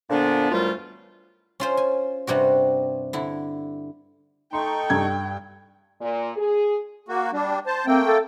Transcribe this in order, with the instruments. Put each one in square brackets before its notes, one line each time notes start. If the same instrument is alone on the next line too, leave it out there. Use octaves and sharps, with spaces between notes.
[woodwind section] A#2 D3 F3 B3 D4
F#2 E3 F3 G3 A3 F4
[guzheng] C#4 F4 C5
G#5
G2 C3 G3 F#4
D3 E4
[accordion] A3 D#4 C#6 [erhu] G5 [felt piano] C6
[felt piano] G2 A4 G#6
[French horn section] A#2
G#4
[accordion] A#3 F#4
G3 D4
C5 A5
[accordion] A3 A#3 G5 [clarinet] C4
[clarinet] A4